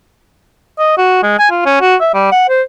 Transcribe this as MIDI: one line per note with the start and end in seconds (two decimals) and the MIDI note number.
0.79 0.96 75
0.98 1.22 66
1.23 1.36 56
1.39 1.51 80
1.51 1.62 65
1.65 1.78 61
1.81 1.95 66
2.01 2.13 76
2.14 2.31 55
2.32 2.46 78
2.49 2.62 72